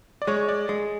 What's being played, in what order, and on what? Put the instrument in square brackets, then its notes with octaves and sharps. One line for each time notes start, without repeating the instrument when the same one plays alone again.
[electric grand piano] D5
[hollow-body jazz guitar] G#3 [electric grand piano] C#5
[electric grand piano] D5
[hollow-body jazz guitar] G#3